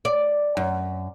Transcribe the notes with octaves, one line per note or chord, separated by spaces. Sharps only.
D5
F#2